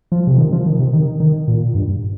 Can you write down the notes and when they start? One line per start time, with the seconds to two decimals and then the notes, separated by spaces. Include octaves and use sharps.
0.12 F3
0.27 C3
0.38 D#3
0.53 F3
0.66 D#3
0.79 C3
0.93 D#3
1.20 D#3
1.48 A#2
1.75 G2